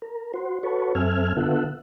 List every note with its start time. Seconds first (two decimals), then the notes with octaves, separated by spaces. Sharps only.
0.02 A#4
0.34 F#4 C5
0.63 F#4 A4 B4 C#5
0.95 F#2 C4 A4 E5 G#5 F6
1.37 D3 B3 F4 A4 E5 F#5